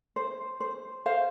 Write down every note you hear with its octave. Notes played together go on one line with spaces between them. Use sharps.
C5
C5
C5 F5